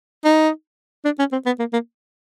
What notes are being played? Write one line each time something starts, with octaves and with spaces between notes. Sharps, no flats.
D#4
D4
C#4
C4
B3
A#3
A#3